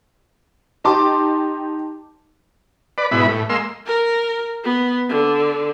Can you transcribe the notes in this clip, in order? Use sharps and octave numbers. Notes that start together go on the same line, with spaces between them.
D#4 G4 A5 C6 D6
B4 D5
G#2 B2 E4 B5
A2
G#3 A#3 C6 E6
A#4
B3
D3